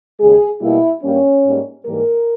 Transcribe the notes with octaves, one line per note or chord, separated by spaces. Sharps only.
D#2 C#3 G#3 G#4
B2 G3 A#3 E4
G2 G3 A#3 C#4
G#2 G3 A#3
G#2 E3 G3 A#3 A#4